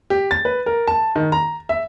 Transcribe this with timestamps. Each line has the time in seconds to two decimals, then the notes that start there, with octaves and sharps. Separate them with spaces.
0.10 G4
0.31 A6
0.45 B4
0.66 A#4
0.87 A5
1.16 D#3
1.32 A#5
1.69 E5